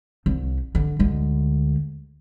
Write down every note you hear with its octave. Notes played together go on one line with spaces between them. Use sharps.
C2
D3
D2 G#3